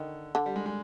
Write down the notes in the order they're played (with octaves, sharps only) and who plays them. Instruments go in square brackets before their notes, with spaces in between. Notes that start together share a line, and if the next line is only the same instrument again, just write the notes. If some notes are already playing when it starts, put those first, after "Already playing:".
Already playing: [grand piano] D3 [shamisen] D#3
[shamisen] D3
[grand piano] G3
G#3
G#3